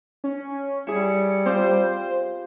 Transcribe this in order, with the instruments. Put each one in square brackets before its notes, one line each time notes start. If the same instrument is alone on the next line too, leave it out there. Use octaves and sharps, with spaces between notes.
[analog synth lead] C#4
[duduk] G3 [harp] E4 G#4 [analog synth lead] C#7
[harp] C4 F4 G4 [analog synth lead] C5